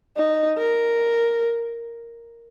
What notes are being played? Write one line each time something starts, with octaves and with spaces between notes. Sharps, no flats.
D#4
A#4